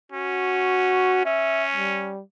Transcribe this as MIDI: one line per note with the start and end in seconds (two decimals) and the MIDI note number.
0.12 1.22 61
0.12 1.23 66
1.25 2.14 61
1.25 1.64 76
1.75 2.22 55